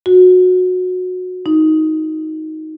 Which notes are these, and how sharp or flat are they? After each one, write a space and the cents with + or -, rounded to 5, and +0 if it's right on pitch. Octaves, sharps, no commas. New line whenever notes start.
F#4 -20
D#4 +15